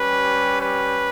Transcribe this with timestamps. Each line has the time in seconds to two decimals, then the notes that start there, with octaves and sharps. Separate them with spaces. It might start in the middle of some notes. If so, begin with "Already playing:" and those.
Already playing: G3 C#4 G4 B4
0.60 B4